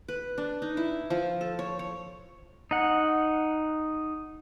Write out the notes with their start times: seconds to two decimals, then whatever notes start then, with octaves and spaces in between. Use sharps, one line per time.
0.08 B4
0.38 D4
0.62 D#4
0.77 E4
1.10 F3
1.41 A4
1.59 C#5
1.79 C#5
2.71 D#4 F#5